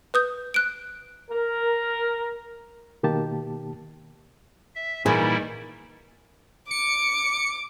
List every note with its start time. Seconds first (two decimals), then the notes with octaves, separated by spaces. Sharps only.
0.14 B4 D#6 G6
0.54 F#6 D7
1.31 A#4
3.03 B2 D#3 A#3 G4 A5
4.75 E5
5.06 A#2 D#3 E3 G3 E4 G#4
6.71 D6 C#7